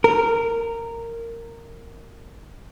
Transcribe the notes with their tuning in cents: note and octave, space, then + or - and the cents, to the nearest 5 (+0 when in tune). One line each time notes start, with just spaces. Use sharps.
A#4 -15